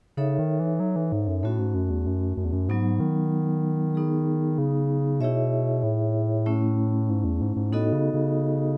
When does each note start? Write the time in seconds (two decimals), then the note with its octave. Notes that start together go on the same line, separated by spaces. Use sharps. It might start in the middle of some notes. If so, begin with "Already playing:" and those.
0.17 C#3 D#4 A4 C#5 E5
0.39 D#3
0.60 E3
0.80 F#3
0.96 E3
1.12 G#2
1.28 F#2
1.43 A2 A3 C#4 F#4
1.59 G#2
1.75 F#2
1.90 E2
2.07 F#2
2.37 F#2
2.44 E2
2.52 F#2
2.69 G#2 F#3 B3 D#4
3.00 D#3
3.95 B3 D#4 G#4
4.58 C#3
5.20 B2 E4 G#4 C#5 E5
5.83 A2
6.46 A3 C#4 E4
7.10 G#2
7.25 E2
7.41 G#2
7.56 G#2
7.72 A2 B3 D#4 F#4 A4 D#5
7.93 C#3
8.14 C#3